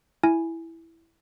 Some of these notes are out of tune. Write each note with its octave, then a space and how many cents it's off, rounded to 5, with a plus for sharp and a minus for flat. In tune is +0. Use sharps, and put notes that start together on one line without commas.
E4 +0 G#5 +0